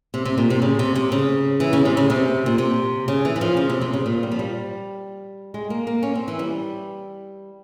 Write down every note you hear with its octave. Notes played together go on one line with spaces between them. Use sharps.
C3
C3
A#2
C3
C#3
C3
C3
C#3
E3
C#3
C3
C#3
C3
A#2
C3
C#3
E3
E3
F3
C#3
C3
C3
C#3
A#2
G3
F3
G3
G#3
A#3
A#3
C#4
C4
E3
G3